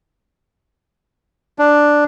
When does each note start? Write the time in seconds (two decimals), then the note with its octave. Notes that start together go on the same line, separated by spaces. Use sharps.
1.59 D4